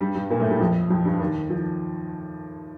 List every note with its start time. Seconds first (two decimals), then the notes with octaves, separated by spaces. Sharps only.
0.01 G2 G3
0.15 G2 G3
0.30 A#2 A#3
0.40 A2 A3
0.50 G2 G3
0.60 F2 F3
0.90 F2 F3
1.05 G2 G3
1.20 D#2 D#3
1.50 F3